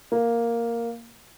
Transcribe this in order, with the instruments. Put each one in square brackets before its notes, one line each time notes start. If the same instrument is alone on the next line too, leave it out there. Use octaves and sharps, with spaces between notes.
[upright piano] A#3